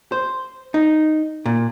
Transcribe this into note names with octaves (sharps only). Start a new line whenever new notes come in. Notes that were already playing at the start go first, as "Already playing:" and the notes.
C5
D#4
A#2